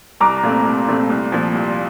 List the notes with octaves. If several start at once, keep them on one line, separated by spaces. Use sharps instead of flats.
C2 A#5 D6
A#2 A3 C4
C2
A#2 A3 C4
C2
A#2 F3
C2